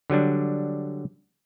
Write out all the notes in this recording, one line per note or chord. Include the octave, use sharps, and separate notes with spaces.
D3 F#3 G3 D4